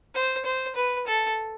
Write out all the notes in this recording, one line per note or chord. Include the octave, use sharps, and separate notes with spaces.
C5
C5
B4
A4